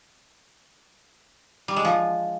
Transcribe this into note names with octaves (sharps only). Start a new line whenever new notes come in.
G3
G#3
F3